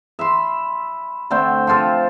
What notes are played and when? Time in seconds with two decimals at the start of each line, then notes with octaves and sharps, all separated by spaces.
0.19 E5 B5 C6
1.30 D3 A3 C4 G5
1.67 F3 C4 F4 A4